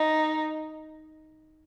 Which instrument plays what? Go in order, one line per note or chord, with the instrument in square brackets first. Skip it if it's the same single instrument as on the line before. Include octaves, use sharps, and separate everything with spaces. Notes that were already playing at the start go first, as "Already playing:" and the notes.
Already playing: [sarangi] D#4